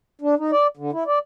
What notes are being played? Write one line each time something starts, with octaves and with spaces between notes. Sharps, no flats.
D4
D#4
D5
D3
E4
D5